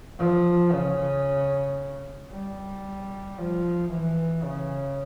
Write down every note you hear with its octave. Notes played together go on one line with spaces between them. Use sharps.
F3
C#3
G3
F3
E3
C#3